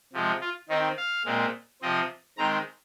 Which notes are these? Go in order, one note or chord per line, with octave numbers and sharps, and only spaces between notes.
C3 F3 G#3
F4
D#3 C4 D#4
F5
A#2 G#3 C4
C3 F3 C4 D#5
D#3 G#3 C4 A#5